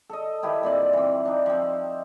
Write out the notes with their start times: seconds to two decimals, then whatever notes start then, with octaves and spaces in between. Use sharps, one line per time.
0.10 A4 D#5
0.43 D#3 E4 G4 B4
0.63 A#2 C4 D5 F5
0.93 E3 C4
1.25 D4 D#4
1.46 F3 C4